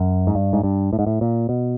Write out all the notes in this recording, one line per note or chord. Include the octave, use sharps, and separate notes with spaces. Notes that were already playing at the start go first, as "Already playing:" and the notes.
Already playing: F#2
G#2
G2
G#2
G2
A2
G#2
A2
A#2
B2